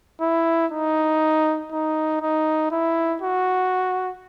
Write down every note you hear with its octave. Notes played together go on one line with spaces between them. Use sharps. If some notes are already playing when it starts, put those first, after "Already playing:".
E4
D#4
D#4
D#4
E4
F#4